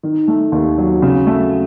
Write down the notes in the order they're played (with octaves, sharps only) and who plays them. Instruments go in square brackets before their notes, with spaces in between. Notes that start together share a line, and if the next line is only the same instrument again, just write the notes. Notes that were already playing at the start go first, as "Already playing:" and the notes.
[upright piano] D#3
A3
D#2
F#3
C#3
A3